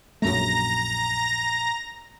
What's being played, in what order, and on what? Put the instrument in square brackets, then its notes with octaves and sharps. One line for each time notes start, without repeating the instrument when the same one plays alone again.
[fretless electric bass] A#1 F#2 A3 [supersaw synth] A#5 A#6